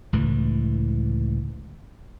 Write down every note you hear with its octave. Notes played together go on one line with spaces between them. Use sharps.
C#2 A2 D3 E3